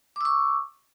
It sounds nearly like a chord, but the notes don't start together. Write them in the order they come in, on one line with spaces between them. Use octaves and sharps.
D6 E6 C#6